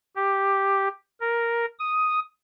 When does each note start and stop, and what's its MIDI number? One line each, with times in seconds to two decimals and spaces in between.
0.16 0.88 67
1.21 1.65 70
1.79 2.20 87